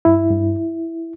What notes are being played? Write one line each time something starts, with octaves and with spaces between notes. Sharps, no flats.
G2 E4
G2